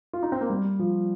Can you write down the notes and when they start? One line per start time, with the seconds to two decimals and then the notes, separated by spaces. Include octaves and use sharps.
0.13 F4
0.23 D#4
0.32 C4
0.41 A#3
0.50 G3
0.79 F3